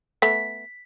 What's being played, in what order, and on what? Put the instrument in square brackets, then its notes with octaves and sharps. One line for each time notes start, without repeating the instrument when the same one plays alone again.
[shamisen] A3 B3 [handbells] B6